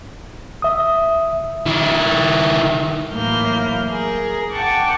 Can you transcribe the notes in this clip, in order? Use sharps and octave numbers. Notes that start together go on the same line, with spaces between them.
E5 D#6
D#3 E4
A2 E3 F#3 A#3 F6 G6
G#4 A#4
F#5 G5 A5 C#6 D6